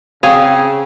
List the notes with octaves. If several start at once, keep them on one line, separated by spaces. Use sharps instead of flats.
C#3 C4 G#4 F5